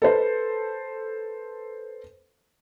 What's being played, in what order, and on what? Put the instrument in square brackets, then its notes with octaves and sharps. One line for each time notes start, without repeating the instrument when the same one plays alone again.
[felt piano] A4 B4 C5